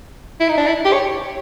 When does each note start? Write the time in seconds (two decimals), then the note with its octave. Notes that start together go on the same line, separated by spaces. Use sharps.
0.40 E4
0.48 D#4
0.57 D4
0.66 E4
0.85 G4
0.93 C#5